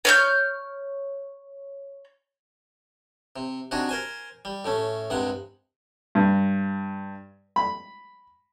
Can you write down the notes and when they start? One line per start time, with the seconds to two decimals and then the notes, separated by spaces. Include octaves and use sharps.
0.05 C#5 F6 G6
3.36 C3
3.71 C3 D4 D#4 F#4 G#4
3.89 A#4 C5 G#5
4.45 G3
4.65 A2 A3 C#4
5.10 C2 G2 C3 G#3 F#5
6.15 G2
7.56 B5